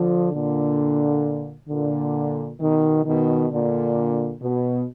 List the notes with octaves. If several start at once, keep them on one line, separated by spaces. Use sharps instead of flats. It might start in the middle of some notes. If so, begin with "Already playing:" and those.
Already playing: D3 F3
A#2 D3
A#2 D3
B2 D#3
B2 D#3
A#2 D3
B2